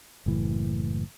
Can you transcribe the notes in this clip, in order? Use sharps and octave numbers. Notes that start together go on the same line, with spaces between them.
F#1 A2 E3